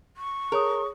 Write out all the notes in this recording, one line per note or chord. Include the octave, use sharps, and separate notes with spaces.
C#6
G#4 A#4 C#5 D#6